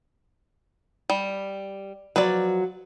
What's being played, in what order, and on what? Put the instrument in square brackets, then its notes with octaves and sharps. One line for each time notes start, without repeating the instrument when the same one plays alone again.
[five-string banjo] G3
[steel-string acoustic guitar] F3 F#3 [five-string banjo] B4 D5